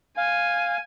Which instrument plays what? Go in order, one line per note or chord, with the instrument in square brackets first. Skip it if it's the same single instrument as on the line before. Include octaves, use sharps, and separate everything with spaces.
[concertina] F5 [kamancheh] G#5